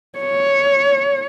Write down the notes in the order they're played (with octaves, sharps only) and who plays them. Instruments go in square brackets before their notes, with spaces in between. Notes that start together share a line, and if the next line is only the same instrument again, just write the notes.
[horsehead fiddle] C#5